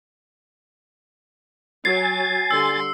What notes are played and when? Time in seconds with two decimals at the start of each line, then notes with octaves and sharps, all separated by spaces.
1.85 F#3 G#5 A6 C7
2.51 D3 G3 C6 E6